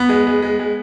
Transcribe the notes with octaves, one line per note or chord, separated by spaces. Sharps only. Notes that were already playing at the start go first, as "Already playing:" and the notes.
Already playing: B3
G#3
G#3
G#3
G#3